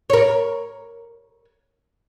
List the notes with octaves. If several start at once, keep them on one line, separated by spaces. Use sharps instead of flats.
A#4 C#5